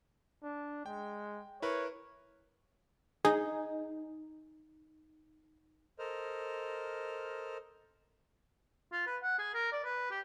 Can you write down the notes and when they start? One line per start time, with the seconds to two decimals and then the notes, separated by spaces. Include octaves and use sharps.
0.43 D4
0.86 G#3 G5
1.62 E4 A#4 B4 C#5
3.25 D#4 G#4
5.99 A4 A#4 C5 D#5 F6
8.92 F4
9.07 B4
9.23 F#5
9.38 G#4
9.54 A#4
9.72 D5
9.84 B4
10.11 G4